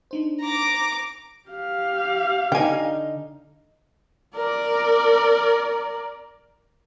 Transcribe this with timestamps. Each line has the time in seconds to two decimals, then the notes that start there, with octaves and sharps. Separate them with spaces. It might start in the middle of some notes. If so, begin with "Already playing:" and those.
0.11 D4 D#4 C5
0.40 A#5 D6
1.48 G4 F5
2.52 D3 D#4 G5 G#5
4.36 A#4 D5